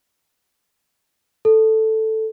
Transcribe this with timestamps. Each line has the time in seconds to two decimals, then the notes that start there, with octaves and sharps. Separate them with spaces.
1.45 A4